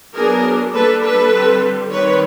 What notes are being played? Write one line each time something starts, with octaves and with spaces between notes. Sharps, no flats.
F#3 B3 D4 G#4 A#4
G3 A#3 D4 A4 B4
A4 B4
D3 G3 C4
D#3 G3 C4 B4 C#5